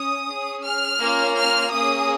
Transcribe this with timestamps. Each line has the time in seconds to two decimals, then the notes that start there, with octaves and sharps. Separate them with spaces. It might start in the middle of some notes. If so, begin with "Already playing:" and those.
Already playing: C#4 D#6
0.27 C#4 G#4
0.64 F6
1.01 A#3 C#4 F4
1.37 F6
1.73 A#3 C#4 G#4 D#6